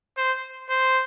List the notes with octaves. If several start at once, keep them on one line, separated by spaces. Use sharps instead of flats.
C5
C5